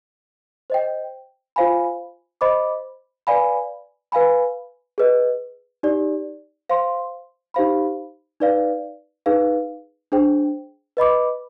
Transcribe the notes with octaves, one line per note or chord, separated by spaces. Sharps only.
C5 D#5 G5
F4 C5 F5 G#5 B5
C5 D#5 B5 D6
B4 D5 F5 G#5 B5
B4 F5 G#5 B5
G#4 B4 D#5
D#4 G4 D5
C5 F5 C6
D#4 G4 C5 F5 B5
D#4 B4 D5 F5
D#4 G#4 B4 F5
D4 G#4 C5 G5
B4 D#5 B5 D6